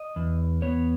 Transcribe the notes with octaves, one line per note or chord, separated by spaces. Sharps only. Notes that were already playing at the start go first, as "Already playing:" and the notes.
Already playing: D#5
E2
B3 C#5